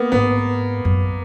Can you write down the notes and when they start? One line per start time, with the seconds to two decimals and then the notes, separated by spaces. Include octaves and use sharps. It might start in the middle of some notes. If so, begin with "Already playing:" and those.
Already playing: A#3 B3
0.12 G#2 B3
0.85 F#2